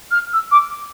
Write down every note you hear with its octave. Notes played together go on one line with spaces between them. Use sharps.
F6
E6
D6